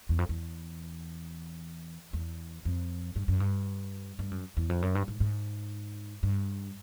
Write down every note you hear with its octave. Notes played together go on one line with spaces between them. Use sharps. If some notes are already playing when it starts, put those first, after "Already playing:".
E2
F2
E2
E2
F2
G2
F#2
G2
G2
F#2
E2
F2
F#2
G2
G#2
G#2
G2